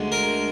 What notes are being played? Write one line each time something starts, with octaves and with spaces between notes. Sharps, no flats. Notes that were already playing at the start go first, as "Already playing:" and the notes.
Already playing: D2 D3 G#3
A#4